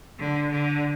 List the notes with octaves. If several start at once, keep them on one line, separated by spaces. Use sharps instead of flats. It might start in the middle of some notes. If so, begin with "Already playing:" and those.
D3
D3